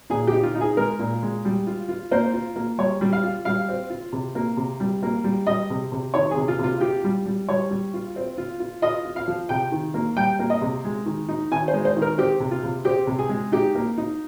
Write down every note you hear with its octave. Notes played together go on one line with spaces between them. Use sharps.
A#2 G#4
G4
D#4
F4
D#4
G#4
G#3 A#4
A#2
G#3
G3
F4
F4
A#3 C5
F4
A#3
G3 C#5
G3
F5
F4
G3 F5
C4
F4
C3
A#3
C3
G3
A#3
G3
G3 D#5
C3
C3
D#3 C#5
G#4
C3
F4
C3 F4
F4 G4
G3
G3
G3 C#5
G3
F4
C4
F4
F4
F4 D#5
F4
F5
F3
C3 G5
D#3
A#3
G3 G5
A#3
D#5
C3
G#3
D#3
D#4
D#3 G#5
C5
G#3
C5
D#3
A#4
C4 G4
C3
F4
C3
C4 G4
C3
G#4
G#3
D#4 G4
A#3
D#4